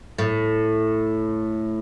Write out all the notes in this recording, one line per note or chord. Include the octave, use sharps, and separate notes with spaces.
A2